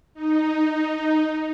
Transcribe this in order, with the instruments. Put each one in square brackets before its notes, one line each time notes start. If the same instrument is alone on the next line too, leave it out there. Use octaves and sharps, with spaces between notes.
[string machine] D#4